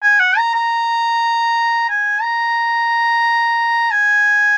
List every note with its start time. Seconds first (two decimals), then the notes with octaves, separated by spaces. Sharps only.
0.02 G#5
0.20 F#5
0.37 A#5
0.54 A#5
1.89 G#5
2.22 A#5
3.91 G#5